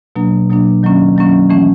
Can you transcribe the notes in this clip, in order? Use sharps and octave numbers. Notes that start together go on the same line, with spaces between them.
B2 F#3 A#3 D4
B2 F#3 A#3 D4
D#3 F#3 A#3 C#4
D#3 F#3 A#3 C#4
E3 A3 C#4